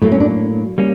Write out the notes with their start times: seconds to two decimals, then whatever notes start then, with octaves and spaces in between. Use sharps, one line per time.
0.02 A2 F#3 A3 A#3
0.12 C#4
0.20 D4
0.78 G3 A#3 C#4